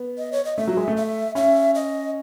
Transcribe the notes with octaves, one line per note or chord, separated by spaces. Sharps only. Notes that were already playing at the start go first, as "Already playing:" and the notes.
Already playing: B3
D#5
C#5
D#5
A3 E5
F#3
G#3
A3
E5
C#4 E5
D#5